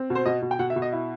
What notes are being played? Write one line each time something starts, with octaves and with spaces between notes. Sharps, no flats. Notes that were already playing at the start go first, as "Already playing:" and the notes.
Already playing: C4
B2
C5
B2 D#5
B2
G5
B2 F#5
E5
B2
D#5
E4